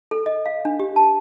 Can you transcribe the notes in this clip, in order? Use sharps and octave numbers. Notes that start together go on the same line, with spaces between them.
A4
D#5
F5
D4
G4
A5